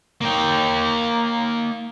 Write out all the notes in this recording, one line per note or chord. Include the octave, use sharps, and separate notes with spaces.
A#3 G5